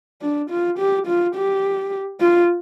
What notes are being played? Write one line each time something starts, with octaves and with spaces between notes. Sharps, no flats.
D4
F4
G4
F4
G4
F4